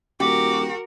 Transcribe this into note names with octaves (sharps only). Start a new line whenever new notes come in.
D#1 F#4 G4 A#4 D6